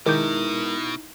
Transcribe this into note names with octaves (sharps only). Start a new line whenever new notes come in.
B2 D#3 G#3 D#4 E4 A#4 D6 G6